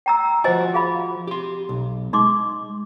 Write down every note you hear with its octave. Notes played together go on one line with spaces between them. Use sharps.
G5 A#5 E6
F3 F#4 C5 D#5 G#5
G#4 F5 B5
G4 C6
B1
G#3 D#4 C6 D6